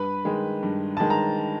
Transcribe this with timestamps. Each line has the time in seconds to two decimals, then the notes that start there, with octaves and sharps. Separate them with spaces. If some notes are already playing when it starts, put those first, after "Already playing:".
Already playing: G2 B4 B5
0.25 D#3 G#3
0.63 G2
0.97 D#3 G#3 A5
1.10 A#5